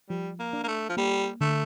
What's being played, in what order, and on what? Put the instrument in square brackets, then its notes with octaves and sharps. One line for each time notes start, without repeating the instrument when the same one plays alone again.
[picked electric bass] F3 [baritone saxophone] G3
[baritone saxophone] A#3
[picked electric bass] D4
[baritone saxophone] A#3
A3
F3
[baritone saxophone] G3 [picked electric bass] A#3
[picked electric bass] D3 [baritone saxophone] A3